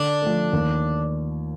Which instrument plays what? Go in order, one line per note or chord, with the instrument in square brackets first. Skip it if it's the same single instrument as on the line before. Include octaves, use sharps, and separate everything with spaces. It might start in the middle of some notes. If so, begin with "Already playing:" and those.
Already playing: [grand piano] D3 [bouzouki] D4
[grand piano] F3 A3
D#2